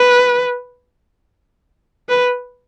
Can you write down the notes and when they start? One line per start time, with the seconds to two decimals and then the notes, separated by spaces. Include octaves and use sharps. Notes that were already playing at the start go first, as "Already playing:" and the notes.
Already playing: B4
2.09 B4